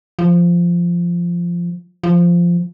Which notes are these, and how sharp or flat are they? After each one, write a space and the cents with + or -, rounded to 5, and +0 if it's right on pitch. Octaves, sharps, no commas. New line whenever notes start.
F3 -10
F3 -10